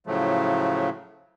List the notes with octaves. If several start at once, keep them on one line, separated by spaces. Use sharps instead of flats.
A2 C#3 F3 F#3 A3